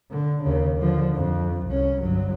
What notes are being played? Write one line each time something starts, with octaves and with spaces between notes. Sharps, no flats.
D3
D#2 C#3
D3 F3
F2
C2 C#4
G1 F#3